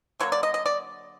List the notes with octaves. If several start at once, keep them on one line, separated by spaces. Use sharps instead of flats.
D3 F#3 A#3 C#5
D5
D#5
D#5
D5